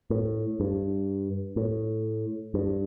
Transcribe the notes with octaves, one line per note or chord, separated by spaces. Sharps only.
A2
G2
A2
G2